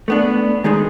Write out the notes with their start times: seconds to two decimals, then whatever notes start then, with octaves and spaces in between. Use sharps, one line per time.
0.08 A3 B3 D4
0.64 D#3 G#3 D#4 G#4 C6